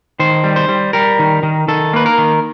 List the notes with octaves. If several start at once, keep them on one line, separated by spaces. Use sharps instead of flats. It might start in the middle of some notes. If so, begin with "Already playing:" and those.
D#3 C5
G3
C5
G3
G3 A#4
D#3
D#3
D#3 A4
A#3 B4
A#4
D#3